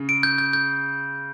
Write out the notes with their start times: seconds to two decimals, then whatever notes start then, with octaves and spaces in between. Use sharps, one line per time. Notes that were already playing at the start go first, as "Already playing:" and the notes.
Already playing: C#3
0.09 D7
0.23 G6
0.38 G6
0.53 G6